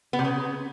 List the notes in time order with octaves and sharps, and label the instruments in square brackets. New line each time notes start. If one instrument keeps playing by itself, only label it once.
[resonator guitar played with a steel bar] B3
C3
C#3